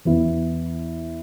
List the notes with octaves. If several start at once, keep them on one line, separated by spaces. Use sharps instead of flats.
E2 E3 B3 E4